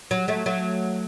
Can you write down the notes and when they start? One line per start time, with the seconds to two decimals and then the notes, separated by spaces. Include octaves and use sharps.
0.11 F#3
0.28 F#3 A3
0.46 F#3 A3